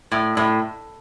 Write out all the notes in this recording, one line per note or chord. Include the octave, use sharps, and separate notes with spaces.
A2
A2